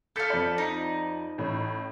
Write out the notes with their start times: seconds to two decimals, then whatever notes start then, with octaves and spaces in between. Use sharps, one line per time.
0.16 A4 F5 G6 B6 C#7
0.30 F2 D5
0.58 D#4
1.38 A1 A2